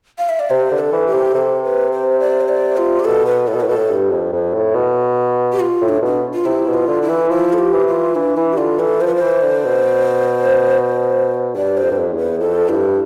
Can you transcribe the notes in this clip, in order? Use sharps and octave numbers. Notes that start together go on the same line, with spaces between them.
F5
E5
D5
C3 C5
D3
A4
E3
G4
C3
C3 A4
B4
C5
D5
C5
D5
F4
G4
B2 A4
B4
A2 A4
B2
A2 B4
B2 A4
A2
G2
F2
F2
A2
B2
G4
F4
A2
D4
B2 D4
F4
C3 E4
B2
F4
D3
E4
E3
F3 E4
A4
G4
E3
F4
E3 D4
E3 E4
G4
D3 F4
E3 A4
F3 C5
B4
C5
E3
D3
B2
G2 D5
C5
F2
G2
F2
E2
B4
F2 A4
G2 E4